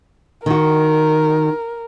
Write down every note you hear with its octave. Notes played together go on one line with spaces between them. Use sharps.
D#3 F#4 A#4